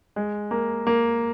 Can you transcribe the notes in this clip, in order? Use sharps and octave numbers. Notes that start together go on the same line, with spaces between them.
G#3
A#3
A#3